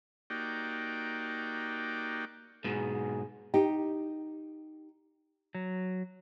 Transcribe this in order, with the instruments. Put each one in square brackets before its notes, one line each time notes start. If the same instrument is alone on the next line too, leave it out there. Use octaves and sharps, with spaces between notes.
[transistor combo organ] A#3 D#4 F#4 G4 D5 G5
[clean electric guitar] G#2 B2 [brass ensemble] G#4
[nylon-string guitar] D#4 G4
[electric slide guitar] F#3